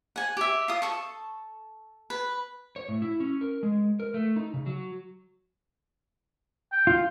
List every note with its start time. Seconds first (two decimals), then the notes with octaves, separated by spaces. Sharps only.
0.16 F#5 G#5
0.37 G4 E5
0.68 F4 D#6
0.82 A4 C#6
2.10 B4
2.76 C#5
2.88 A2
3.02 E4
3.20 C#4
3.41 A#4
3.63 G#3
4.00 A#4
4.14 A3
4.36 D#4
4.54 C#3
4.66 F#3
6.72 G5
6.87 F4